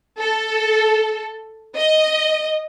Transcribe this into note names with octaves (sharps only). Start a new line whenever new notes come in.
A4
D#5